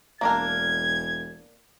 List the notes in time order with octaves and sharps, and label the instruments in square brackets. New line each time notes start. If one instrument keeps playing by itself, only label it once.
[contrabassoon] E1 [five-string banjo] A#3 D4 A#4 [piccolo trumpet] G#6